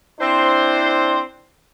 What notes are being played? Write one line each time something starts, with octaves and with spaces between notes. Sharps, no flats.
C4 D4 E4 C5